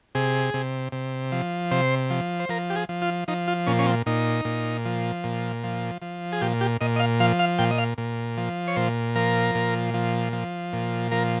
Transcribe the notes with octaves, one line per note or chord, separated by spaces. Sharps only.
C3 G#4
C3
C3
F3
C3 C5
F3
C5
F3 A#4
G4
G#4
F3
F4
F3 D#4
F4
A#2 C#4
C#4
C4
A#2 D#4
A#2
F3
A#2
F3
F3
G#4
A#2 G4
G4
A#2 D#5
D#5
F5
F3 F5
F5
A#2 G5
D#5
F5
A#2
F3
C#5
A#2 C5
F3 A#4
A#2
F3
F3
A#2
F3 A#4